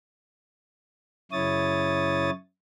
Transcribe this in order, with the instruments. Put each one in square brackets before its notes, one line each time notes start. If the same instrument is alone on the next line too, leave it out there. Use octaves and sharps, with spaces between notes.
[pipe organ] F#2 C#3 E4 C#5 D#6 A6